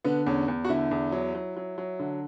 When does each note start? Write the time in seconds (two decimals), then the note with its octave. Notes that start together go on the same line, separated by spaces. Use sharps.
0.04 D3 B3
0.26 E2 C#4
0.48 E2
0.65 F#4
0.69 D3 E4
0.91 E2
1.12 F#3
1.35 F#3
1.57 F#3
1.78 F#3
1.99 D3